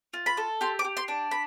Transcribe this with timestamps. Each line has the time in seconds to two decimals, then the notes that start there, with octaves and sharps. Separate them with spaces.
0.13 F4
0.26 B5
0.37 A4
0.61 G4 C6
0.79 D6
0.85 G4
0.97 C6
1.08 D4
1.31 B5